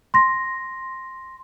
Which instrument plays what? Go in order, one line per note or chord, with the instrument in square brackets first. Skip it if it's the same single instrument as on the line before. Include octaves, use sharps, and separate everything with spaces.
[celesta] C6 A#6